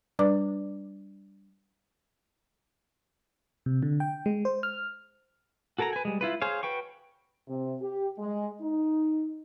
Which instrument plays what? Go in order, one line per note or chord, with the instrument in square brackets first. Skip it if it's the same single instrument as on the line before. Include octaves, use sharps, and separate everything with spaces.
[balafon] G3 D4 B4 D5 D6
[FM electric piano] C3
D3
G5
G#3
C5
F6
[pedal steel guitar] F#4 A4 A#4 G#5 A#5
B4 G#5
G3 G#3
E4 F4 B4
G#4 C5 C#5 F5
F#4 B4 G5 C#6
[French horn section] C3
G4
G#3
D#4